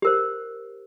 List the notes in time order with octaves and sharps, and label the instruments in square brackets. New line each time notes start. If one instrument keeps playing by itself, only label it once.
[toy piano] G4 A#4 C5